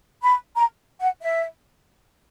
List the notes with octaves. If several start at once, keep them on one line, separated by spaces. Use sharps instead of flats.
B5
A#5
F#5
E5